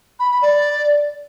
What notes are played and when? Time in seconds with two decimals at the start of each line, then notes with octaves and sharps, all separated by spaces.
0.20 B5
0.31 B5
0.42 D5